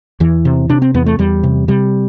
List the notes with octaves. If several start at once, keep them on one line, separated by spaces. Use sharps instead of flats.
E2 E3
C3
C3 D4
C4
E2 B3
A3
E2 G3
C3
C3 G3